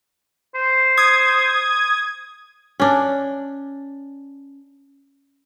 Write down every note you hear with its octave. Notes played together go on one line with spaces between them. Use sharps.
C5
D#6 G#6
C#4 D4